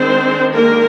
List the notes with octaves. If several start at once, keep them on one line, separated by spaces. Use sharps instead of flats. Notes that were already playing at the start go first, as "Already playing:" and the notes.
Already playing: D#3 G#3 C4 D4 C5
A#3 A#4